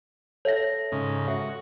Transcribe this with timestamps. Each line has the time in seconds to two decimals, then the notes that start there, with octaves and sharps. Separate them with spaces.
0.45 A4 C#5 E5 A#6
0.92 G#2 C#3
1.28 F#4 E5